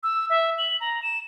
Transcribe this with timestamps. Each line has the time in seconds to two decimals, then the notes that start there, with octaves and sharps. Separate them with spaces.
0.03 E6
0.30 E5
0.58 F#7
0.81 A#5
1.03 E7